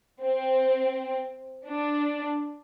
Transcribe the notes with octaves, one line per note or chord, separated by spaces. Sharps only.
C4
D4